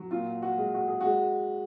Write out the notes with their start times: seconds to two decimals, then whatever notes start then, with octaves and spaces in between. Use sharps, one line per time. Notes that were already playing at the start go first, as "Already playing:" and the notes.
Already playing: F#3
0.11 A#2 F4
0.42 F#4
0.58 G#3
0.74 F#4
0.88 G#4
1.01 F#4
1.06 G#3